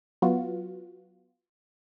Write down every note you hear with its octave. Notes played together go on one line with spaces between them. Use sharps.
F#3 B3 F4 F#4